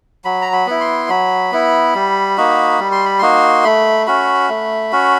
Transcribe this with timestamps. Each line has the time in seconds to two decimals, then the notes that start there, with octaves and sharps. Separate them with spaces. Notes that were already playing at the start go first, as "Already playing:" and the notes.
0.25 F#3 B5
0.42 A#5
0.53 B5
0.67 B3 E4
0.81 C6
1.09 F#3 B5
1.52 B3 E4
1.95 G3
2.37 A#3 D#4 F#4
2.79 G3
2.92 C6
3.06 B5
3.19 A#3 D#4 F#4 C6
3.64 A3 B5
4.07 C#4 F#4 B5
4.49 A3
4.92 C#4 F#4